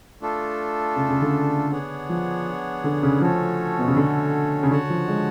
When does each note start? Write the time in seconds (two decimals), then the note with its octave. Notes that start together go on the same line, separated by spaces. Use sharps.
0.21 A3 D4 F4 A4
0.96 C#3
1.09 C#3
1.21 D3
1.71 B3 D4 G#4 C#5 F#5
2.09 F3
2.84 D3
3.03 C#3
3.21 F3 A3 C#4 F#4 A4 C#5
3.79 B2
3.87 C#3
3.96 D3
4.63 C#3
4.71 D3 F#4 C#5 F#5 A5
4.90 F3
5.08 G#3